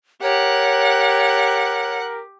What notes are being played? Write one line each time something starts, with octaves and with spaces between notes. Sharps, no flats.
G4 A#4 C#5 F#5